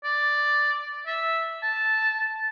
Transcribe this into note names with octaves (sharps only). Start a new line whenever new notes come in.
D5
E5
A5